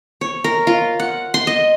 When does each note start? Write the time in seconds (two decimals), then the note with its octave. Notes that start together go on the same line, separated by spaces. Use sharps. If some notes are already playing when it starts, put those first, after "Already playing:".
0.21 C#5
0.44 A#4
0.67 F4
1.00 F#5
1.34 C6
1.47 D#5